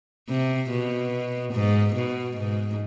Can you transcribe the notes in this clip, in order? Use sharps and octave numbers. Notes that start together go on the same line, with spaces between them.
C3
B2
G#2
B2
G#2